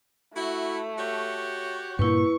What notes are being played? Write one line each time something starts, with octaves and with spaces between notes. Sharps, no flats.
A3 E4 F#4
F#4 G4 C#5
G2 A#2 A#3 E4 B4 C#6